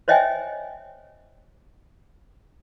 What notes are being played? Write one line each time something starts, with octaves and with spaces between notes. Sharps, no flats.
C5 C#5 D#5 E5 G5 G#5